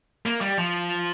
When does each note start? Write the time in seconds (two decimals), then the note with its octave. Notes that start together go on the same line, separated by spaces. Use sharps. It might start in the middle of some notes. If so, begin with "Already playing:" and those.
0.26 A#3
0.41 G3
0.58 F3